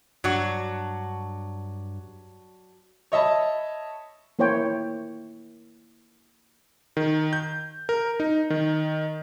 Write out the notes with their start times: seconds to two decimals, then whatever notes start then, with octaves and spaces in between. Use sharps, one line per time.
0.24 G2 F#3 D4 F#4
3.12 C#5 D#5 E5 A5 B5
4.39 A#3 E4 C5 C#5 G5
6.97 D#3
7.33 G6
7.89 A#4
8.20 D#4
8.50 D#3